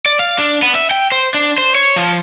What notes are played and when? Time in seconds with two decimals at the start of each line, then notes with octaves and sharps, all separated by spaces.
0.06 D5
0.19 F5
0.39 D4
0.63 B3
0.75 E5
0.91 G5
1.12 C5
1.34 D4
1.58 C5
1.75 C#5
1.96 F3